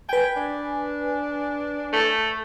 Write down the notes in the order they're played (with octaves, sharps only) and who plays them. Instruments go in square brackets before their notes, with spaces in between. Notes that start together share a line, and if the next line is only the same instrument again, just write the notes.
[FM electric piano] B4 G#5 [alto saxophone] G5
[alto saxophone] D4
[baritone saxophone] A3